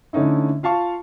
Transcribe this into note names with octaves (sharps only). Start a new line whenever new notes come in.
D3 A3 C#4 D#4 E4
F4 F5 A5 C#6